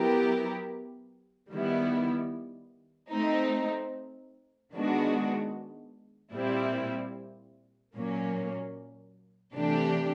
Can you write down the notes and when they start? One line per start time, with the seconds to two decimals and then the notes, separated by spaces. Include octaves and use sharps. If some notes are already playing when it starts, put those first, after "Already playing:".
Already playing: F#3 B3 E4 G4 A#4
1.51 D#3 G3 B3 E4
3.12 A3 C4 D#4
4.73 D#3 G#3 B3 D4 F#4
6.33 A#2 G3 C4 E4
7.95 A#2 F#3 A#3 C#4
9.55 C3 E3 A3 D4 G4